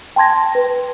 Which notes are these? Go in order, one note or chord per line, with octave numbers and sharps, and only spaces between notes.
G5 A5 C6 G#6 A#6
B4